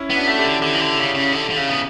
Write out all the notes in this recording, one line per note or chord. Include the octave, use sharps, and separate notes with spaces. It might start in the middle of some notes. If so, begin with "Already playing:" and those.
Already playing: C#4 E4
B3
D4 F#4
A3
E4 G4
D3
D3 E4 G4
E3
D3
C#3
C#3
D3
D3
C#3
B3